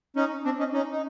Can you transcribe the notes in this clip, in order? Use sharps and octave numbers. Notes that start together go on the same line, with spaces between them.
C#4 D#4
C4 D4
C#4 D#4
C#4 D#4
D#4